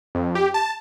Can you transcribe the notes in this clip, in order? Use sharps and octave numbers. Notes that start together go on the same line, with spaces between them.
F2
G4
A5